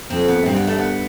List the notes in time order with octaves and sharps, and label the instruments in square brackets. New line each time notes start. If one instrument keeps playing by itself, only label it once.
[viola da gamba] F2 [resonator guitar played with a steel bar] C4
[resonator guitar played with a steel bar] B3
[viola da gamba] G2 [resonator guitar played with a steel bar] C4
[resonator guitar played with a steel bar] B3
A3
B3